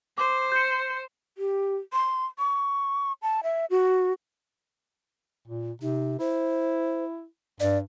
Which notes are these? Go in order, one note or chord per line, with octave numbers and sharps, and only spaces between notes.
C5 D6
G6 C#7
G4
C6
C#6
A5
E5
F#4
A#2
C3 D#4
E4 C5
G2 D5